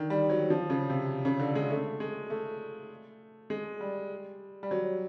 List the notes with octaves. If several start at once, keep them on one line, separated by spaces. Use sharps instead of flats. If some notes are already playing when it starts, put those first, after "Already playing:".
Already playing: D3 D#3
G3
F#3
F3
C#3
C3
C#3
D3
G#3
A3
G#3
A3
G#3
G3
G3
F#3